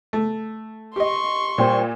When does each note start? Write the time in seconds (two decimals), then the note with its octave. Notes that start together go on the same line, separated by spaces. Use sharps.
0.13 A3
0.96 G4 D#5 C6 C#6
1.58 A#2 G3 C5